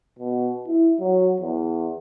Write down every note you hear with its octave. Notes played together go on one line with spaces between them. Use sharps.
B2
E4
F#3
E2